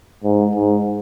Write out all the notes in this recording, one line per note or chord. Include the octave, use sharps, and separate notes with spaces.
G#2
G#2